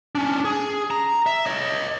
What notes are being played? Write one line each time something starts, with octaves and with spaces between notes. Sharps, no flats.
C#4 D4
G#4
A#5
E5
C#5 D#5